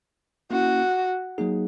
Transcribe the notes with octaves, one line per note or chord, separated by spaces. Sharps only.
A#3 C#4 E4 F#4
F#3 A#3 D#4 G#4